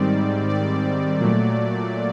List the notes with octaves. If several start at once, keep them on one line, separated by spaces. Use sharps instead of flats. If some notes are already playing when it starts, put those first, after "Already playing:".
Already playing: G#2 D#3 G3 C4 D5
D5
A#2 F#3 A3